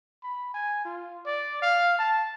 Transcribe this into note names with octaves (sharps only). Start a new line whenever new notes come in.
B5
G#5
F4
D5
F5
A5